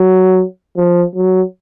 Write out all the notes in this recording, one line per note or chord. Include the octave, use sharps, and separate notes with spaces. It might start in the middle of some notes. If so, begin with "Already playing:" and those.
Already playing: F#3
F3
F#3